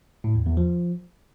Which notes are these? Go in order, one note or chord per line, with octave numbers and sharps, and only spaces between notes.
A2
E2
E2
F3